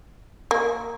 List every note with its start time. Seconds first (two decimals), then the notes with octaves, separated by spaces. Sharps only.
0.51 A#3